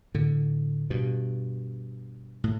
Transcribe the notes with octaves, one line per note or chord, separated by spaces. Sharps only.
A2 D3
G2 B2
A2